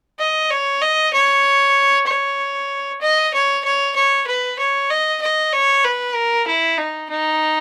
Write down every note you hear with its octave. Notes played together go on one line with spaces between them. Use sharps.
D#5
C#5
D#5
C#5
C#5
D#5
C#5
C#5
C#5
B4
C#5
D#5
D#5
C#5
B4
A#4
E4
D#4
D#4